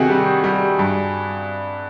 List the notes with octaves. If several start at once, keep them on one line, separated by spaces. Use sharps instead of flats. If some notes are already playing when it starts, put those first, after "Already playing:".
Already playing: C3 D#3 F#4 G#4
G3
G3
G2